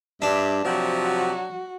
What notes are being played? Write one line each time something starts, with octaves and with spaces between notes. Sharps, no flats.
G2 D4 E5
C3 F3 F#3 F#4